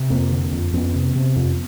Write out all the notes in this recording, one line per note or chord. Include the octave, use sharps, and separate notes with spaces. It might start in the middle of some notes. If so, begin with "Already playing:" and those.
Already playing: C3
F2 A#3 C4
D3
F2
F2 B3 C#4
C3
C3
F2